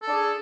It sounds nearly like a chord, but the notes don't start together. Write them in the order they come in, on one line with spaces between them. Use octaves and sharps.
A4 D4 G#4